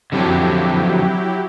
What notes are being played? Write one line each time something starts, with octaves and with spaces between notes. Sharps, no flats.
D3 F3 F#3 C4 E4 G4